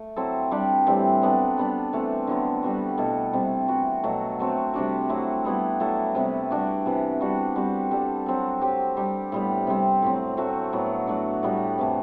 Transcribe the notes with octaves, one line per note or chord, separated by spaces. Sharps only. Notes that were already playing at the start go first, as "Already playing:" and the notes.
Already playing: A3
F#3 C4 E4 A4
G3 D4 G4
A2 E3 G3 C4
F#3 B3 D4 A4
G3 B3 D4
E3 A3 C4
D3 F#3 B3
G3 B3 F#4
B2 A3 E4 A4
C3 G3 C4
E3 B3 F#4
B2 F#3 A3
F#3 A3 C4 F#4
C3 G3 D4 F#4
F#3 A3 C4 E4
G3 B3 E4
F#3 A3 E4 A4
C3 G3 B3
G3 D4 F#4
C3 E3 B3
G3 D4 F#4
G3 C4 F#4
G3 D4 A4
F#3 C4 F#4 A4
F#3 C4 G4
G3 D4 G4
A2 G3 B3
C3 G3 C4
A2 F#3 C4
F#3 A3 C4 F#4
A2 F#3 B3
F#3 A3 D4
A2 G3 B3 F#4
C3 E3 A3